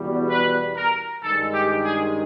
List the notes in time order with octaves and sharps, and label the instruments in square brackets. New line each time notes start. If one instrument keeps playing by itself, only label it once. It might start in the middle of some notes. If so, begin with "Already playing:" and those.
Already playing: [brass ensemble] E2 B2 G3
B4
A#4
G2 D#3 G#3 A4
G4
G#4